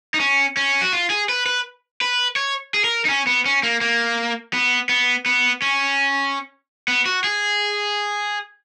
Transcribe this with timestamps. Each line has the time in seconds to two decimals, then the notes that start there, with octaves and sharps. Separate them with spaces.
0.14 D#4
0.20 C#4
0.57 C#4
0.81 F#4
0.93 F4
1.10 G#4
1.29 B4
1.46 B4
2.01 B4
2.36 C#5
2.74 G#4
2.84 A#4
3.05 D#4
3.09 C#4
3.27 B3
3.46 C#4
3.63 A#3
3.81 A#3
4.53 B3
4.89 B3
5.26 B3
5.62 C#4
6.88 B3
7.06 F#4
7.24 G#4